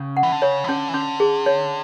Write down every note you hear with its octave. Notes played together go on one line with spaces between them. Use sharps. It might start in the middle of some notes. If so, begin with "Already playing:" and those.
Already playing: C#3 C#4
F#5
E3
D3
C#3 C#5
E3
D3 C#4
E3
D3 C#4
G#4
C#5